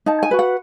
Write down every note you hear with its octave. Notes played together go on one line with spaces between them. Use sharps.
D#4 A5
G#5
F#4 B4
F#5